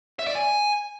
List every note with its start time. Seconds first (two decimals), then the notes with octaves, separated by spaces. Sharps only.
0.19 E5
0.27 D5
0.35 G#5